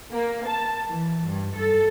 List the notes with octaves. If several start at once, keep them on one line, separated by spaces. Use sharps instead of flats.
A#3
A5
E3
G2
A4